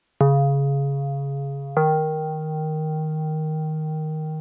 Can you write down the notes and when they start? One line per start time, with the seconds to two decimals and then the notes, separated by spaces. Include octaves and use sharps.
0.21 C#3
1.77 D#3